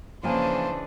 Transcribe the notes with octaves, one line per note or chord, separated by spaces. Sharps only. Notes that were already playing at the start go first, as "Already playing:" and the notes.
C#3 E3 F3 A#3 D4 C5 G#5 A5